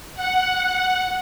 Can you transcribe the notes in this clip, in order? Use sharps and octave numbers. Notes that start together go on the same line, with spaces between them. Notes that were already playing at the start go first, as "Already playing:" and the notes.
F#5